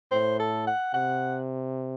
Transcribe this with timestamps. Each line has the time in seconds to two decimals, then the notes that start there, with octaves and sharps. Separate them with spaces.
0.12 A2 C5
0.40 A4
0.67 F#5
0.94 C3 F#5